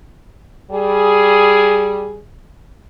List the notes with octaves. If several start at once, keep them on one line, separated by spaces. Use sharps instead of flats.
G3 G#4